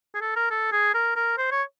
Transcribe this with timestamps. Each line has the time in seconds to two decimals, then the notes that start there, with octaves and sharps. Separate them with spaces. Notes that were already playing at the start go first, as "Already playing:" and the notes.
0.15 G#4
0.21 A4
0.36 A#4
0.51 A4
0.72 G#4
0.95 A#4
1.16 A#4
1.38 C5
1.52 C#5